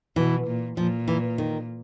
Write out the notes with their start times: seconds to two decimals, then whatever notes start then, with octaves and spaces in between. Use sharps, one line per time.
0.16 B2 E3
0.47 A#2
0.77 A#2 F3
1.08 E3
1.38 D#3